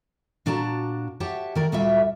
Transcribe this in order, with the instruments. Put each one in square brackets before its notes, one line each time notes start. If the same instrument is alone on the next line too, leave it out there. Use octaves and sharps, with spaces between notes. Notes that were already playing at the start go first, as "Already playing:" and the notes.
[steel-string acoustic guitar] A#2 D4 F#4 A5 A#5
G4 C#5 E5 F#5 A5
D#3 A#4 D5
D2 A#2 F#3 G3 F4 E5